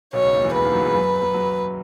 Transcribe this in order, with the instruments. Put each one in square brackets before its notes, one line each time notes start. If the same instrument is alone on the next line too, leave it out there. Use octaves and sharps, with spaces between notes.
[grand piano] B1 B2 [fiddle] C#5
[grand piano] C#2 C#3
D#2 D#3
E2 E3
[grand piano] C#2 C#3 [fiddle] B4
[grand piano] D#2 D#3
F#2 F#3
E2 E3
F#2 F#3
F#2 F#3
F#2 F#3